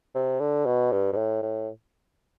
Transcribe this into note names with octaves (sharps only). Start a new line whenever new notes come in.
C3
D3
B2
G2
G2
A2
A2